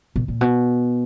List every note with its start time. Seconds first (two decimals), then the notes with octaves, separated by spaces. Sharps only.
0.16 B2
0.28 A#2
0.41 B2